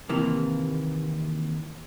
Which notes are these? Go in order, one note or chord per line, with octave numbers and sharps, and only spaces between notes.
D#2 C3 E3 A#3